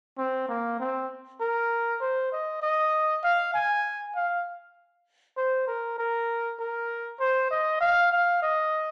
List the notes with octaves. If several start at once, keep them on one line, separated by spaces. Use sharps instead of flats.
C4
A#3
C4
A#4
C5
D#5
D#5
F5
G#5
F5
C5
A#4
A#4
A#4
C5
D#5
F5
F5
D#5